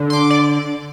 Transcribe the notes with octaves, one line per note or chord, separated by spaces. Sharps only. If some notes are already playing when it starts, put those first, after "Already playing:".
Already playing: D3
C6
D6
D5